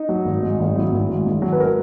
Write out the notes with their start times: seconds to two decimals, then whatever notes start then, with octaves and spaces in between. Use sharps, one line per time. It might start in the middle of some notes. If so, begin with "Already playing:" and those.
Already playing: D#4
0.09 F#3
0.25 G#1
0.43 G#2
0.60 G#1
0.75 F#3 E4
0.92 G#1
1.09 G#2
1.26 G#1
1.42 F#3
1.52 B4
1.60 A#4